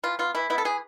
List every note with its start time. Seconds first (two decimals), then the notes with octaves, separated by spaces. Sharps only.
0.03 E3 F4
0.19 B3 F4
0.35 E3 E4
0.50 B3 E4
0.58 A4
0.65 E3 G#4